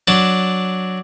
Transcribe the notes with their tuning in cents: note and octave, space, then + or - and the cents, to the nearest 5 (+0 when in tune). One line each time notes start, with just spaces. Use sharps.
F#3 +0 D4 +0 A5 +0